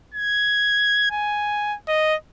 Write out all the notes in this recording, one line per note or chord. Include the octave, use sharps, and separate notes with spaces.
G#6
G#5
D#5